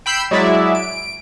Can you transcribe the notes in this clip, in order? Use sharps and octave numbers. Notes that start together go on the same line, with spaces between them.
G5 B5 E6 G6 C7
F#3 G#3 E4 D5 E5
D7